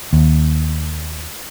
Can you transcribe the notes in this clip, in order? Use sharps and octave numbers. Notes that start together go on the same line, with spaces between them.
D#2